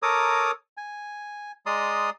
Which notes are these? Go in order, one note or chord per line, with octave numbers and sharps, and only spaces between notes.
A4 A#4 C#5 A#5 D6 D#6
G#5
G#3 D5 A#5 C6 D#6